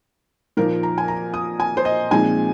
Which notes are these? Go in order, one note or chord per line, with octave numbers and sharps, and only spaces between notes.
A#2 F3 A#3 D#4 A#4
A#5
G#5
A#5
D#6
G#5
C5
D#5
A#2 F3 G#3 C4 D#4 G#5